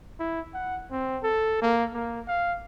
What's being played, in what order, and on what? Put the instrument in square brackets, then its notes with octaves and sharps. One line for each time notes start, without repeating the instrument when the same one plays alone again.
[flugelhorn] E4
F#5
C4
A4
A#3
A#3
F5